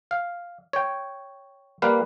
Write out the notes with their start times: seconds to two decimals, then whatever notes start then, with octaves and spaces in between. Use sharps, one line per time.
0.11 F5
0.73 C#5 G5
1.82 G3 A#3 B4 F5